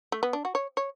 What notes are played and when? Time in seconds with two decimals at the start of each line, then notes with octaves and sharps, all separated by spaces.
0.12 A3
0.23 B3
0.33 D4
0.45 F#4
0.55 C#5
0.77 C#5